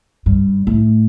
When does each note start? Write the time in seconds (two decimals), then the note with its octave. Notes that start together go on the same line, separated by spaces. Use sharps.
0.26 G2
0.67 A2